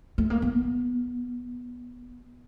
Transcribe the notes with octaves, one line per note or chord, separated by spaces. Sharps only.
A3
A#3
B3